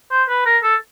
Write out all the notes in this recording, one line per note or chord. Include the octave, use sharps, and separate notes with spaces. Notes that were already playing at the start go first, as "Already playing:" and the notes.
C5
B4
A#4
A4